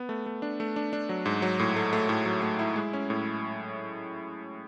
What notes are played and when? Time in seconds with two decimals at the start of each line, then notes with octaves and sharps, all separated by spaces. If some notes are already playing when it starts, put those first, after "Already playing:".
Already playing: B3
0.09 A3
0.26 A3
0.42 D4
0.60 A3
0.76 D4
0.93 D4
1.09 F#3
1.26 G#2
1.42 F#3
1.60 A2
1.76 A3
1.93 A3
2.09 A2
2.26 F#3
2.42 A3
2.59 E4
2.76 G#3
2.93 C#4
3.10 A2